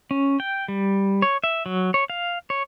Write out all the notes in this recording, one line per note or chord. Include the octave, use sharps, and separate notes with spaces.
C#4
G5
G3
C#5
E5
F#3
C#5
F5
C#5